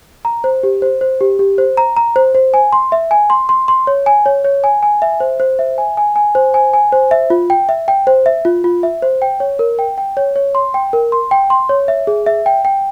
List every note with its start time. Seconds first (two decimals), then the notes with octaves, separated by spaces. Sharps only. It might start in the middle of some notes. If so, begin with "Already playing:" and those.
0.25 A#5
0.44 C5
0.63 G4
0.82 C5
1.01 C5
1.21 G4
1.39 G4
1.58 C5
1.77 A#5
1.97 A#5
2.16 C5
2.35 C5
2.54 G#5
2.73 C6
2.92 E5
3.11 G#5
3.30 C6
3.49 C6
3.68 C6
3.87 C#5
4.06 G#5
4.26 C#5
4.44 C#5
4.64 G#5
4.83 G#5
5.02 E5
5.20 C5
5.40 C5
5.59 E5
5.78 G#5
5.97 G#5
6.16 G#5
6.35 C5
6.54 G#5
6.73 G#5
6.92 C5
7.11 E5
7.30 F4
7.50 G5
7.69 E5
7.88 G5
8.07 C5
8.26 E5
8.45 F4
8.64 F4
8.83 E5
9.02 C5
9.22 G5
9.40 C#5
9.59 A#4
9.79 G5
9.98 G5
10.17 C#5
10.36 C#5
10.55 C6
10.74 G5
10.93 A#4
11.12 C6
11.31 G5
11.50 C6
11.69 C#5
11.88 E5
12.07 G#4
12.26 E5
12.46 G5
12.65 G5